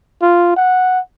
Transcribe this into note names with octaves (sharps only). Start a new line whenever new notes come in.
F4
F#5